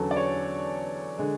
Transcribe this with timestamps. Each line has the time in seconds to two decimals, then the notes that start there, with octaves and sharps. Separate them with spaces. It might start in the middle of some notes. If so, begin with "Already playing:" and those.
Already playing: E2 D3 F#3 C#4 A4
0.11 D5
0.16 C#5
1.18 D3 G#3